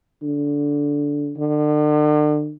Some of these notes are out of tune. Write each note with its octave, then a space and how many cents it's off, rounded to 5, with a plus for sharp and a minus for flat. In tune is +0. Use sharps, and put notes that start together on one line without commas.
D3 -15
D3 +40